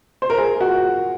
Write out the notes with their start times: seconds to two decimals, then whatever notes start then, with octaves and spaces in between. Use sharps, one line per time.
0.22 C5
0.30 A#4
0.38 G#4
0.60 F#4